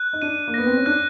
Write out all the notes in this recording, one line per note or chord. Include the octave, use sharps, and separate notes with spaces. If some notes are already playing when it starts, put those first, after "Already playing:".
Already playing: F#6
D#4
D4 D#7
A#3
B3 A#6
C4
C#4
D4 F#6